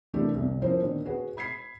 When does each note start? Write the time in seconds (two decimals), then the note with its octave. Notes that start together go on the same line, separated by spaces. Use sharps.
0.13 C3 E3 A3 D4 G4 A#4
0.34 G1 C2
0.62 F3 C#4 E4 A#4 C5
0.82 A#2 D3 D#3
1.05 F#4 G#4 B4 F#5
1.37 B5 G#6 B6 C7